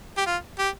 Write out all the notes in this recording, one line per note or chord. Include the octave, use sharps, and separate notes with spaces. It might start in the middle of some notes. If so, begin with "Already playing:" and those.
G4
F4
G4